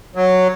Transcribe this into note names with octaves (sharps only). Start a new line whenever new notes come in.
F#3